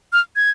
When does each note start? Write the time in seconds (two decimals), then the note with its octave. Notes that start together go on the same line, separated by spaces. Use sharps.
0.13 F6
0.36 G#6